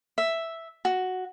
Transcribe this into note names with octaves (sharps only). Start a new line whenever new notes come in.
E5
F#4